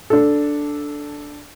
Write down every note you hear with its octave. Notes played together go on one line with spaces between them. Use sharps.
D4 A4